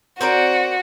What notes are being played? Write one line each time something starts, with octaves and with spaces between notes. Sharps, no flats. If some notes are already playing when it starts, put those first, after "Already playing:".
C4 F#4 A#4 D5